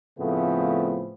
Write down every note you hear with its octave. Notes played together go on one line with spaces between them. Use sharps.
A2 C#3 F3 A3 B3 C4